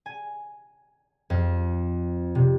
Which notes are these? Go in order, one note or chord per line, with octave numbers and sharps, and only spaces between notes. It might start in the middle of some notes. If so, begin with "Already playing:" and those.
G#5
F2
C3